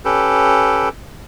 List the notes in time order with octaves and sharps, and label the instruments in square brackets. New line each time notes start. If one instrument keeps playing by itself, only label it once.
[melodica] C#4 G4 A4 B4